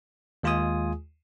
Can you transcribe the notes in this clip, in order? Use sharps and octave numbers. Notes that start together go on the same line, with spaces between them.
D#2 G#3 F4 G#4 G#5 D#6